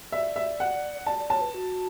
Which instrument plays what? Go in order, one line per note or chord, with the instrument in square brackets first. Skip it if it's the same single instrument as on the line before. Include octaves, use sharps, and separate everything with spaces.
[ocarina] D5 [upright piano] E5
[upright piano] E5
F#5
[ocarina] D5 [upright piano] A5
[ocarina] D5
[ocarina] C#5 [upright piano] A5
[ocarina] B4
F#4